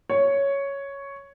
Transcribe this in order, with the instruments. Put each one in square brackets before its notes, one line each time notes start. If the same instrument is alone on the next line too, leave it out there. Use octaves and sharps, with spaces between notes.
[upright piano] C#5